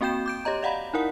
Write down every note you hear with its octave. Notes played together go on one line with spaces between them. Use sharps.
A#3 C4 F#4 G5 G6 E7
D6 G6 D7
G4 C#5 D#5 A#5
D5 D#5 F5 F#5 A#5 B5
D#4 E4 A#4 F#5